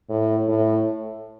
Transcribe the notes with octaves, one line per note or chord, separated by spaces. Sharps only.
A2
A2